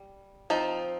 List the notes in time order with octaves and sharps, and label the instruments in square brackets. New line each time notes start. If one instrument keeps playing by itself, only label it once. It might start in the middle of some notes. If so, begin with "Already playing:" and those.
Already playing: [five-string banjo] G3
F3 C4 D#4